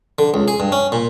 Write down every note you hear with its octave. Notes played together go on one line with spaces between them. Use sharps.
D3
C#2
G#4
G2
C#4
A#2